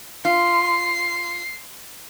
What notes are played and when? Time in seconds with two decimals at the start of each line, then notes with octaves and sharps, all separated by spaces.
0.25 F4 C7